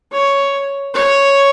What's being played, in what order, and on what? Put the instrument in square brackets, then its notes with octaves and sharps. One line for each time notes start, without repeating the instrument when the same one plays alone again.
[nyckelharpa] C#5
C#5